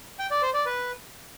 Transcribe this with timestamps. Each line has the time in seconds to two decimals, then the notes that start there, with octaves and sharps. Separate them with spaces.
0.19 G5
0.31 D5
0.42 C5
0.54 D5
0.66 B4